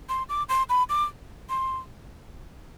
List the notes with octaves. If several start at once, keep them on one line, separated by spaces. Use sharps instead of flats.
C6
D6
C6
B5
D6
C6